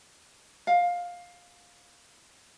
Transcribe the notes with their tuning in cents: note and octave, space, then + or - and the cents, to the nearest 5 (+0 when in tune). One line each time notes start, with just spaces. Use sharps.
F5 +15